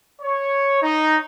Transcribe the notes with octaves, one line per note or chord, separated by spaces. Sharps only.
C#5
D#4